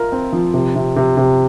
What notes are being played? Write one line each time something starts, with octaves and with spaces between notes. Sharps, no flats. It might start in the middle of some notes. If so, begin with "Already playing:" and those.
Already playing: F4 A#4
C4
F3
C3
C3
C3
C3